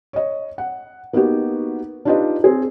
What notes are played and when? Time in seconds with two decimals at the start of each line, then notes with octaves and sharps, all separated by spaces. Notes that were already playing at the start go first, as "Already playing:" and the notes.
0.13 C#5 D#5
0.58 F#5
1.13 A#3 B3 D#4 F#4 G4
2.05 D4 D#4 F4 G4 B4 D#5
2.44 C4 G#4